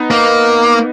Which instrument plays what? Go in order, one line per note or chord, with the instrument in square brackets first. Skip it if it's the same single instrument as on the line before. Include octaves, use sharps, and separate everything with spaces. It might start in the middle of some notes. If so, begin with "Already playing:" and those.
Already playing: [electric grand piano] B3 D#4
[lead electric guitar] A#3